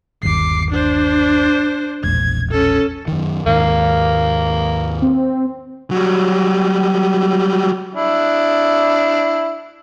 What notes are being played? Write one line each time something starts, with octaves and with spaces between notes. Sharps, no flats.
G1 D#2 D6 C7
D4 C5
E1 A#1 G#6
C#4 A4
F#2 D#3
D#2 G#2 D#3 A#3
C4
F#3 G3
D4 E4